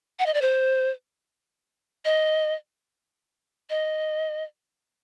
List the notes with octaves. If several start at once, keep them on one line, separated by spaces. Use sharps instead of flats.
F#5
D#5
D5
C5
D#5
D#5